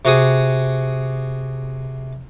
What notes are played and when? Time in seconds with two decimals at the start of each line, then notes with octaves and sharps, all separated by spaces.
0.05 C3 F#4 G#4 D#6